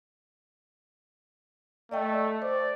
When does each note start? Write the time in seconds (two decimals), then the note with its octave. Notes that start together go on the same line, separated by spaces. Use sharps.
1.91 A3 D5 D#5 G5
2.42 C5 D5